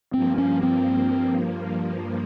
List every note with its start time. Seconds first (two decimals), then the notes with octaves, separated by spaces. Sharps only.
0.14 G2 F3 A#3 C4
0.38 C#4
0.63 C4